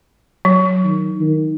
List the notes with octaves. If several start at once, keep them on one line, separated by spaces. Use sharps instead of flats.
F#3
D#3
D#3